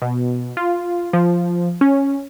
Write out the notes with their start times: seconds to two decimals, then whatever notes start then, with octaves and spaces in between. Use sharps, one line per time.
0.02 B2
0.57 F4
1.13 F3
1.81 C#4